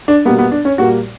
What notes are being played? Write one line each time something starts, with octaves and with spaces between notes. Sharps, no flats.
D4
B2 G3 A#3 B3
B3
D4
C#4
A#2 G3 A#3 F#4